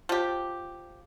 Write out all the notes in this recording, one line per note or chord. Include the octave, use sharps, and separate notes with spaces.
F3 G4